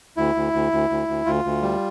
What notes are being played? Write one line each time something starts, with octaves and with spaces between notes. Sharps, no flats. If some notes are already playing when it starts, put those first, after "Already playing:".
D2 E4
D2
D2
D2
D2
D2
D2 F4
D2
G3